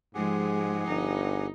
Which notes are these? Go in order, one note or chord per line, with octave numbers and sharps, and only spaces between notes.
G#2 F3 G#3 G4 G#4 F#5
G1 D#4